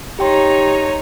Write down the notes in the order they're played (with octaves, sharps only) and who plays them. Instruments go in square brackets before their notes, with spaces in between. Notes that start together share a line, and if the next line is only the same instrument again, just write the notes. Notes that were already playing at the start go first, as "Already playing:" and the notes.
[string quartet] D#4 C#5 A#5 [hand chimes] G4 G5 C6